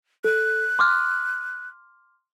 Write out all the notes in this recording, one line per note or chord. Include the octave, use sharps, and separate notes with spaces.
A4 F#6
C6 D6 F6